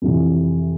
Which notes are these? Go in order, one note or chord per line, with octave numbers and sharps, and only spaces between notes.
F2 C3 E3